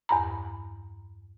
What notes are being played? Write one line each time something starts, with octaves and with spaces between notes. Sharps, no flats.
E2 G2 A#5